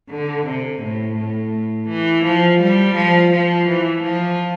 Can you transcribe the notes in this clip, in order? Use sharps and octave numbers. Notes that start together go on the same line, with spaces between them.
D3
C3
A2
A2
E3
F3
G3
F3
F3
E3
F3